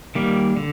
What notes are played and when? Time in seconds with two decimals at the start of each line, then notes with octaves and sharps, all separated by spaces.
0.15 D#3 G3 A#3
0.57 D3